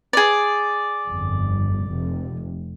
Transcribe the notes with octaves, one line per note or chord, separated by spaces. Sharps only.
G#4 D5
G1 F2
F1 F2 C3